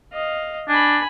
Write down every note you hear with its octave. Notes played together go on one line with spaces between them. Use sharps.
D#5 F5
D4 G#5 B5